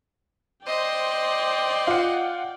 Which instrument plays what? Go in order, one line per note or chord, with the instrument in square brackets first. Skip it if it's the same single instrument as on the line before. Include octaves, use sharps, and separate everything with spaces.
[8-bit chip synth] C5 C6 [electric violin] D5 G5 [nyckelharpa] D#5
[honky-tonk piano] F4 F#5